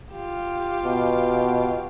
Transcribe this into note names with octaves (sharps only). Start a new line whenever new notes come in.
F4 G4
B2